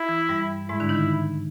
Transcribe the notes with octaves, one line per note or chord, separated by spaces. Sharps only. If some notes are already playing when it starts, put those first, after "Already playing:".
Already playing: E4
E3
G2 G3
G#2 G#3 E4
D3 D4
D#3 D#4